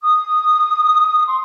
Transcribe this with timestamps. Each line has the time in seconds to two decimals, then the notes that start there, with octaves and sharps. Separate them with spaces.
0.02 D#6
1.26 C6